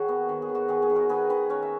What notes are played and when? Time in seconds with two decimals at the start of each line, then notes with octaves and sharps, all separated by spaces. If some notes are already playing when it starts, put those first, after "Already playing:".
Already playing: D#3 F#4 G#4 C#5
0.09 B3
0.29 D#3
0.42 G#4
0.49 D#3
0.55 F#4
0.69 D#3 G#4
0.82 G#4
0.90 D#3
0.95 F#4 A#4
1.09 D#3 G#4 B4
1.29 D#3 B4 D#5
1.50 C#4 A#4 C#5
1.62 E5